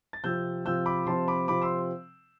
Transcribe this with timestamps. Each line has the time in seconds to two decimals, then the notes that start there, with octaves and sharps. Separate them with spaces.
0.13 A6
0.24 C3 F3 C4 F4 E6 G6
0.65 C3 F3 C4 F4 E6 G6
0.86 B5 D6
1.06 C3 F3 C4 F4 A5 C6
1.28 B5 D6
1.48 C3 F3 C4 F4 B5 D6
1.62 C6 E6